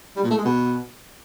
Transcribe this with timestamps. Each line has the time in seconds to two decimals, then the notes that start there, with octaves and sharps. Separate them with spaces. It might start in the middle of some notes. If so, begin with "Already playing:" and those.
0.16 G3
0.23 A#2
0.30 A3
0.38 G#3
0.45 B2